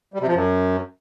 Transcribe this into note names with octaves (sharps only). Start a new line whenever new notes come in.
G3
C3
F3
F#2